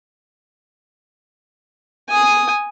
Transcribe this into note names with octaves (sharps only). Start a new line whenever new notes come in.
G#5 D#6